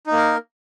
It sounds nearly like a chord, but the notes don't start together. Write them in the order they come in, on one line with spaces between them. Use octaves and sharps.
D#4 A#3 A#4